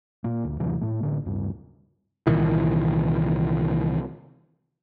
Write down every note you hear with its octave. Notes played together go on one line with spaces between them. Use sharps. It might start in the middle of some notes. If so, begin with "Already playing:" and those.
A#2 A#3
D2
D#2 C3 E3 F#3
A2 A3
A1 D3
D1 G2
C2 A#2 D#3 E3